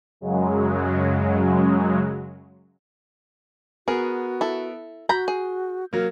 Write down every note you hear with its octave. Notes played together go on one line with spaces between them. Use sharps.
F#2 C#3 F#3 G#3
B3 F#4 G#4 A#4
E4 A4
F#4 A#5 B5 G6
G#4
F#3 A#3 A#4